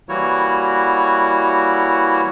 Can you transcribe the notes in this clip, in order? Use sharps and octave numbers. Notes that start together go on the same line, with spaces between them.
E3 G3 A#3 E4 F#4 C#5